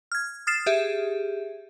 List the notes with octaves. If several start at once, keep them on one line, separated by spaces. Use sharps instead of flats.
F6 G#6
D#6 F6 A6 C7 E7
G4 G#4 E5